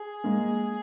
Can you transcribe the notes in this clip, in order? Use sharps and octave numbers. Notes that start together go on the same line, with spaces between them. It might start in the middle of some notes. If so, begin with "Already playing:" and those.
Already playing: G#4
G#3 A#3